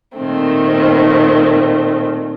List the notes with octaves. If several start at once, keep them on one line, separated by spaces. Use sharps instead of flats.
A#2 D#3 A3 C4